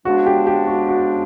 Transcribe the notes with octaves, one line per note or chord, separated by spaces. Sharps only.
C#3 F3 G#3 B3 D4 F#4
G4
G4
F#4
F#4